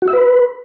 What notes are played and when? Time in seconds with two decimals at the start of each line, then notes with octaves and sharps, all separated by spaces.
0.02 F#4
0.08 E5
0.13 B4